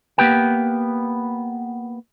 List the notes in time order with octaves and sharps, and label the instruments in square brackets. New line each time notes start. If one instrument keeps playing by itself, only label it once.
[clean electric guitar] A#3 B3 G4 B4 G5